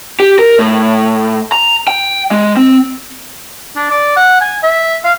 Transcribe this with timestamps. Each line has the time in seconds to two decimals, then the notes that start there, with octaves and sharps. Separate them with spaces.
0.20 G4
0.39 A#4
0.59 A2
1.52 A#5
1.88 G5
2.31 G#3
2.57 C4
3.76 D4
3.91 D5
4.16 F#5
4.41 G#5
4.63 E5
5.04 F5